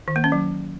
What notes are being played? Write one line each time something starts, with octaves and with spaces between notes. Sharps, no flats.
D#3
A#3
C#4
F#3